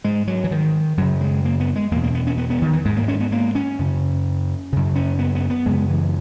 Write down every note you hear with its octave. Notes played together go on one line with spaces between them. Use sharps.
G#2 G#3
F#3
E3
D#3
F#2 C#3 F#3
G#3
A#3
B3
G#3
E2 B2 A#3
A#3
B3
C#4
B3
B3
D#3
E3
G#2 G#3
A#3
C#4
B3
A#3
C#4
F#2 C#3
F#2 C#3
C#4
B3
B3
B3
F#2 C#3 G#3
E3